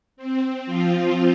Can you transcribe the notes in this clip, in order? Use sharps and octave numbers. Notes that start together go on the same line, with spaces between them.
C4
F3 F4